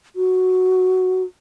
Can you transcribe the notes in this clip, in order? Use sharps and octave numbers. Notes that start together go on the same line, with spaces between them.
F#4